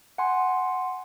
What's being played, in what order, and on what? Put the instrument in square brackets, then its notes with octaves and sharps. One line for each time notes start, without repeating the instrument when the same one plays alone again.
[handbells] F#5 G#5 C6